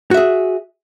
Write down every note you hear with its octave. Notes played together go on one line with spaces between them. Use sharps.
F#4 G#4 E5